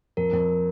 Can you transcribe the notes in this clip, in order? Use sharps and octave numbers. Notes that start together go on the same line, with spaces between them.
F2 A#4
F2